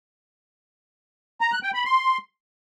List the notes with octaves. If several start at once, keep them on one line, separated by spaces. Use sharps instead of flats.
A#5
F#6
G5
B5
C6